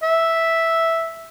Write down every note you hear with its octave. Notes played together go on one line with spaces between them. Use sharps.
E5